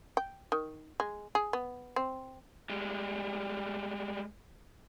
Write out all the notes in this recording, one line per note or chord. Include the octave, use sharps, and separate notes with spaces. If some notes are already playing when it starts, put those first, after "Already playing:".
G5
D#3
G#3
G#4
B3
C4
G3 G#3